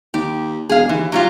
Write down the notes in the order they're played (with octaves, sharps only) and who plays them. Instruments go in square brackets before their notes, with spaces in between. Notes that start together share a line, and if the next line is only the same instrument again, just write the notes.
[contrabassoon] D#2 [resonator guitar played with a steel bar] G4
[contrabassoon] E1 [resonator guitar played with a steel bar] G#4 F5
[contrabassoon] D#2 [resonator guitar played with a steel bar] E3
[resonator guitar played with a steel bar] F#3 G3 F4